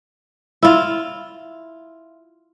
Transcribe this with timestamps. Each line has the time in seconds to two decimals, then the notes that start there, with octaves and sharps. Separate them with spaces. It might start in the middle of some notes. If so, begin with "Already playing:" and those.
0.63 E4 F4